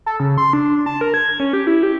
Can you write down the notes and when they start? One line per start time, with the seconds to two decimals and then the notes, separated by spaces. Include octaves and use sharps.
0.06 A4
0.20 C#3
0.37 C6
0.53 D4
0.86 A5
1.01 A#4
1.14 G#6
1.40 C#4
1.53 G4
1.67 E4
1.83 G4